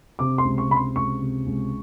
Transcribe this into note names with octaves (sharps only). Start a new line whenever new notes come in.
C3 D6
C6
C#2
C#6
C3 B5
C6
C#2 C#6
C3
C#2